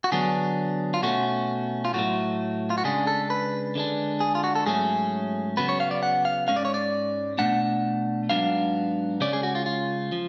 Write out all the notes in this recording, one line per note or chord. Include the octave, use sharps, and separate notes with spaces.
F#4
D3 F#3 B3 D4 G#4
F4
B2 A3 C#4 F#4
F4
A2 F#3 A3 F#4
F4
F#4
C#3 G#3 D4 G#4
A4
B4
D3 G#3 D4
G#4
F4
F#4
A4
G#2 F#3 A3 C#4 G#4
C#3 F#3 B3 B4
C#5
F5
D5
F#5
F5
G#2 G#3 C#4 F5
D5
C#5
D5
B2 A3 D4 F#5
G#2 F#3 B3 D4 F5
C#3 G#3 C#4 D5
G#4
F#4
F4
F4
F3